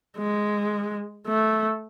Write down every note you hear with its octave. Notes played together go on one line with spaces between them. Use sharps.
G#3
A3